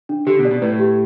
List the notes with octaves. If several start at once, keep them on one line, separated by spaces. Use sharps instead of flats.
D4
D3 G4
B2
D5
B2
A2 B4
G4